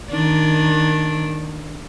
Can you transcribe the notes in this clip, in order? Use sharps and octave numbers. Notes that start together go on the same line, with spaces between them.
D#3 D4